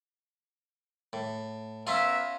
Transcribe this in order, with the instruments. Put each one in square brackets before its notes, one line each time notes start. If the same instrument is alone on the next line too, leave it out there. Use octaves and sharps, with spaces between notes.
[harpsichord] A2
[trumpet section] B3 A#4 E5 [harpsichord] C#4 F4